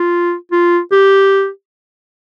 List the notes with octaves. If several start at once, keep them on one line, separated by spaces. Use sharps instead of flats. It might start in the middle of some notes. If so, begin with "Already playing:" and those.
Already playing: F4
F4
G4